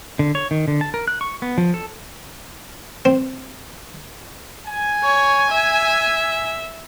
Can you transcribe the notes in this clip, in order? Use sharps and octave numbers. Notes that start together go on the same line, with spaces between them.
D3
C#5
D#3
D3
A5
A#4
F#6
C#6
B3
F3
A4
C4
G#5
C#5
E5